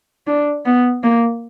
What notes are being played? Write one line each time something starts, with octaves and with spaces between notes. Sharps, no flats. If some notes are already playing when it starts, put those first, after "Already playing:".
D4
B3
A#3